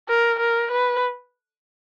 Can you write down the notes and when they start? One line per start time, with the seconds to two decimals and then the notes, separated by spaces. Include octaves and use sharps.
0.09 A#4
0.39 A#4
0.71 B4